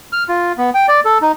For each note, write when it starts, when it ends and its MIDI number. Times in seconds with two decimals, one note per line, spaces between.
0.12 0.24 89
0.29 0.52 65
0.58 0.70 59
0.74 0.87 79
0.88 1.00 74
1.05 1.18 69
1.22 1.32 63